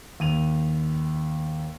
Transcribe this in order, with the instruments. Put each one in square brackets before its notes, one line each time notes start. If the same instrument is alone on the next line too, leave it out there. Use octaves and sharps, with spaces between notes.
[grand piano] D#2 D#7 F7